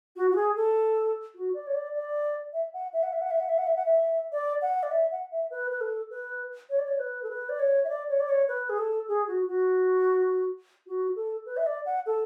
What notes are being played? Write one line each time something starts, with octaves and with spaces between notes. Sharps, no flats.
F#4
F#4
G#4
A4
F#4
D5
C#5
D5
D5
E5
F#5
E5
F#5
E5
F#5
E5
F#5
E5
F#5
E5
F#5
E5
D5
F#5
D5
E5
F#5
E5
B4
B4
A4
B4
C#5
D5
C#5
B4
A4
B4
D5
C#5
E5
D5
C#5
D5
C#5
B4
G#4
A4
G#4
F#4
F#4
F#4
A4
B4
E5
D5
F#5
A4